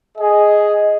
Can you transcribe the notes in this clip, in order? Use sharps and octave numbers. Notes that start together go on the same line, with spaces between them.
G#4 D#5